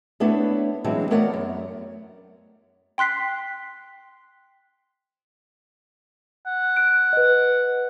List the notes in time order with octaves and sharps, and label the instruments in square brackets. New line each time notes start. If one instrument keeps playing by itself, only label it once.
[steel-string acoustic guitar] A3 B3 D4 E4 B4 C#5
E3 F#3 G#3 C4 D4 E4
A3 B3 A#4 C#5 D5 F#5
F#2
[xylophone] G5 C6 F#6 B6 C7
[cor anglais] F#5
[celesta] F#6 D7
B4 D#5